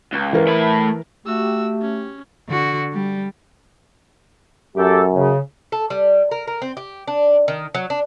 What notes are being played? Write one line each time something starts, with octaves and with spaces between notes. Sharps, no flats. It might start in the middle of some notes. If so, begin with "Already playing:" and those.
C#2
E3 A#4 B4
A3 B5
A3 F#4 G4 E6
C#4
D3 F#4
G3
F#2 A3 G4 A4
C#3
A4
G3
A#4
A#4
C4
G4
D4
D#3
F#3
D4